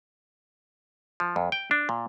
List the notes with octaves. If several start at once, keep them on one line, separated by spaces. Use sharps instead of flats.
F3
F2
G5
D4
A#2